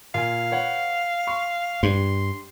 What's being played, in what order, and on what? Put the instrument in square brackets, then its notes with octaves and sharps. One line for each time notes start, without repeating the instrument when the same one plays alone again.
[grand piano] A#2 G#5 [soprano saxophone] F5
[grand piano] B4 C#5 F#5
C6 C#6
[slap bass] G2 [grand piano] G4 [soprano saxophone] C6